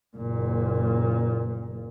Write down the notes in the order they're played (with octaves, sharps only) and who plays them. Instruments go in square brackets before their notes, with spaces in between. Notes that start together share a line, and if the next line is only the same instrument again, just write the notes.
[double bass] F#1 A#2